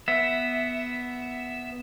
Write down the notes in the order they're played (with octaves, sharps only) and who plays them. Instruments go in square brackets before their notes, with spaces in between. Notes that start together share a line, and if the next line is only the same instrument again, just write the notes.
[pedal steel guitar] B3 E5